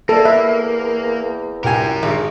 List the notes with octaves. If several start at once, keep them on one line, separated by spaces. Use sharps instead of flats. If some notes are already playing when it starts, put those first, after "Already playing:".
E2 A#3 A4 D5
E5
C2 F#4 A#4 G5 G#5
G#1 G#3